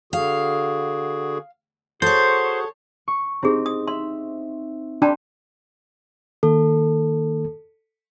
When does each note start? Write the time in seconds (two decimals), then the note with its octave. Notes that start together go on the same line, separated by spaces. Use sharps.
0.13 D3 F#4 G#4 F5
2.02 F#4 G#4 A4 C5 C#5 F#5
3.08 C#6
3.43 C4 D#4 E4 G4 G#4
3.66 D#6
3.87 E5 C6
5.02 D4 G4 G5 A5 B5 C6
6.43 D#3 A#3 A4